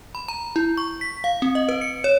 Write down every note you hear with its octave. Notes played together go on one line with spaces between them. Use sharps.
B5
A#5
E4
C#6
B6
F5
C4
D#5
B4
C#7
C#5